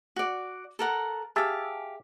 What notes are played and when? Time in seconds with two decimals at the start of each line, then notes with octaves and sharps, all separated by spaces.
0.16 F#4 D5
0.79 A4 A#4 F#5
1.36 G4 G#4 E5 F5 A5